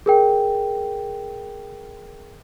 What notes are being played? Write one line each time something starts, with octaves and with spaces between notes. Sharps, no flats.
G#4 A#4 G5